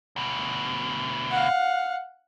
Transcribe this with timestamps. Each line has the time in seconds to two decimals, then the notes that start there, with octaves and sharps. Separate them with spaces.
0.16 D2 B2
1.30 F5 F#5